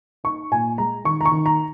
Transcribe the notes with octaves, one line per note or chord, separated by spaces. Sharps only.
D#4 C#6
A#2 G#5
G#3 A#5
D#3 C#6
A#5
C#6
D#3
A#5